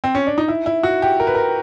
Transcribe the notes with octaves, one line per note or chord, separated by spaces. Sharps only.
C4
C#4
D4
D#4
E4
E4
F#4
G4
A#4
B4
A#4